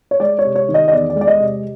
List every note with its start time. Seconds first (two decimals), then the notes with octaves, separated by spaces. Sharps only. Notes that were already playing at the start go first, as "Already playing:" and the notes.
0.11 C#5
0.20 G#3 D5
0.39 C#5
0.45 C3
0.56 C#5
0.69 D#3
0.74 D#5
0.88 D#5
0.91 E2 D5
1.10 D5
1.16 G#3
1.21 D5
1.27 D#5
1.40 C3